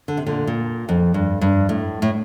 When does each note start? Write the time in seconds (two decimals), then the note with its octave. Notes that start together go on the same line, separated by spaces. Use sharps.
0.08 D3
0.17 C3
0.27 A#2 D3
0.47 A#2
0.89 F2
1.14 G2
1.41 G2
1.69 A2
2.02 A2